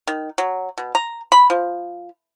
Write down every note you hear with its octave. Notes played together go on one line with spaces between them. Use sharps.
D#3
F#3
B2
A#5
B5
F3